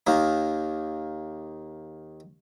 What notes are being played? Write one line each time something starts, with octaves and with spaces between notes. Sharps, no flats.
D#2 D#3 A#3